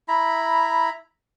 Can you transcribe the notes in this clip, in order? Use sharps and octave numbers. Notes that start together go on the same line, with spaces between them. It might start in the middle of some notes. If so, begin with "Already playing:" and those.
E4 A#5 B5